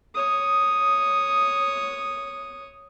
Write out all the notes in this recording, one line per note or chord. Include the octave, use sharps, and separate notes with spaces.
C#5 D#6